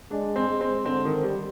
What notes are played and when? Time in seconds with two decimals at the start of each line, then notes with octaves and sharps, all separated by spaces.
0.11 G#3 D4
0.36 C4
0.49 G#3
0.61 C4
0.86 D3 C4
1.05 D#3
1.23 G3